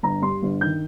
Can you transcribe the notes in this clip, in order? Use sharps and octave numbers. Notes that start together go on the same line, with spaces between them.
G1 A#5
G2 C6
G1
D#3 G6